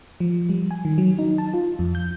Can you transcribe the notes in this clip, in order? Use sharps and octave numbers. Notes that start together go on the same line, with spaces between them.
F3
G3
G#5
D#3
F#3
D#4
A5
F4
F2
G6